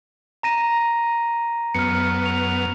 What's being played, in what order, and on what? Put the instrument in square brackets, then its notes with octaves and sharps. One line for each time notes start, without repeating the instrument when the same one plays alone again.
[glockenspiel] A#5 A#6 D#7
[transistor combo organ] F#2 B3 [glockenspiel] F6 C#7
[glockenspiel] F7